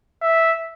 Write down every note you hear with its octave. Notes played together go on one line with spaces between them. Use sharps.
E5